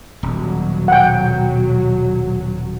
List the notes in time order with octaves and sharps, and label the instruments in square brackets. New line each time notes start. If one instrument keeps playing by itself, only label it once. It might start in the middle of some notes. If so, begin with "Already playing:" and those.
[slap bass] D#1 [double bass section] B2 F#3
[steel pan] F#5 G5